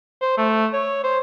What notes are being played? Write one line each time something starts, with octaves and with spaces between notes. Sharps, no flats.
C5
A3
C#5
C5